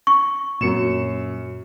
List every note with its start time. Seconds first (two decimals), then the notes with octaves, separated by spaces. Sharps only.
0.07 C#6
0.61 F#2 A#2 C#7 E7